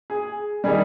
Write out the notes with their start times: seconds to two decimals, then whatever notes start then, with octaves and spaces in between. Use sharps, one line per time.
0.10 G#4
0.64 D#3 G3 G#4